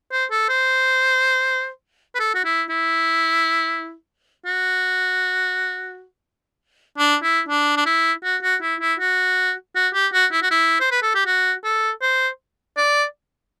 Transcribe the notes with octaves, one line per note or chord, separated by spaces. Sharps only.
C5
A4
C5
B4
A4
F#4
E4
E4
F#4
D4
E4
D4
D4
E4
F#4
F#4
E4
E4
F#4
F#4
G4
F#4
E4
F#4
E4
C5
B4
A4
G4
F#4
A4
C5
D5